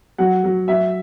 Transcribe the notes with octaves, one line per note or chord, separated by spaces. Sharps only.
F#3 F#5
F#3
F#3 E5